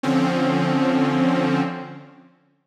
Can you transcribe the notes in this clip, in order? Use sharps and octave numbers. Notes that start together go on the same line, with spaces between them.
D3 F3 C4 C#4